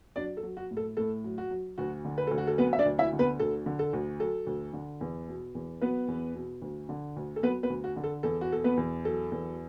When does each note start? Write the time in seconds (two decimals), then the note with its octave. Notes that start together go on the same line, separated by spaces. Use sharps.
0.16 F#3 D4 D5
0.37 A4
0.43 F#3
0.57 F#4
0.71 A2
0.77 A4
0.97 A2 A4
1.24 F#3
1.38 F#4
1.51 F#3
1.78 D2 F#4
2.05 D3
2.18 B4
2.27 D2 A4
2.38 F#4
2.47 A4
2.58 F#3 B3 B4
2.73 E5
2.79 D4 D5
2.86 D2
2.99 E4 E5
3.13 D3
3.19 B3 B4
3.40 D2 A4
3.66 D3
3.79 A4
3.93 D2
4.20 F#3 A4
4.47 D2
4.73 D3
5.01 E2
5.28 B2
5.55 E2
5.81 F#3 B3 B4
6.08 E2
6.35 B2
6.62 D2
6.89 D3
7.16 D2
7.36 A4
7.43 F#3 B3 B4
7.63 B3 B4
7.70 D2
7.84 F#4
7.96 D3
8.04 A4
8.23 E2 A4
8.41 F#4
8.51 B2 A4
8.64 B3 B4
8.77 E2
9.05 F#3 A4
9.32 E2